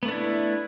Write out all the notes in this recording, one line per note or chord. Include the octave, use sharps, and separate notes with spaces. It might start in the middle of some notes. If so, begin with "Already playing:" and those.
A3 B3 D4 E4